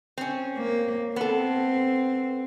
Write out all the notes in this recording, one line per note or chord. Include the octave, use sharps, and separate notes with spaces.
C4 C#4
A#3
B3 C4 A4